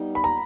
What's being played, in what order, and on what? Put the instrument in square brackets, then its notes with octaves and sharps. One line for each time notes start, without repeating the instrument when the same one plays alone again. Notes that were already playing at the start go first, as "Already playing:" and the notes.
Already playing: [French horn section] G3 B3 D#4
[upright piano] B5
A#5